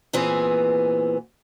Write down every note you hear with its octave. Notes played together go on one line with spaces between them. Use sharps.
A#2 E3 B3 C4 G#4